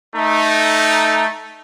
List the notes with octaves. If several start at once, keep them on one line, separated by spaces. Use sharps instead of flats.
A3 D#4